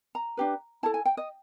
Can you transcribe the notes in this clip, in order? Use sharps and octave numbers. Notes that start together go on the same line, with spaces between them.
A#5
D4 G4 B4
E4 A4 A5
G#5
G5
D#5